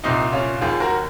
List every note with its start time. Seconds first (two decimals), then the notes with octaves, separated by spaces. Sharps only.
0.04 C2 A#2 C4 D#4
0.32 C#4 F4
0.61 D#2 D#3 F4 G#4
0.80 F#4 A#4